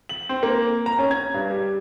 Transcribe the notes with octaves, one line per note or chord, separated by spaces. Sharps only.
F#7
C4
A#3
A#5
C#4
G#6
G2
G3